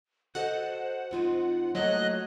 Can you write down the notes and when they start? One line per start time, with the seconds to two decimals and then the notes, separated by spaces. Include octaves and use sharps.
0.35 F#4 A4 C5 D#5 F#5
1.11 F2 C4 D#4 F4
1.75 F#3 A3 A#3 E4 C#5 D#5 F#6